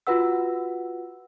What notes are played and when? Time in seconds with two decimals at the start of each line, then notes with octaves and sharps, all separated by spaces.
0.07 F4 F#4 B4 F#5 E6